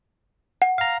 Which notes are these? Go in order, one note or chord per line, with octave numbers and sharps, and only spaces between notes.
F#5
F5 A#5